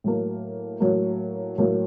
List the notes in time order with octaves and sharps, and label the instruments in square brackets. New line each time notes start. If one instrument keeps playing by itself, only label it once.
[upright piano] A2 F#3 A#3
A2 F#3 A#3
A2 F#3 A#3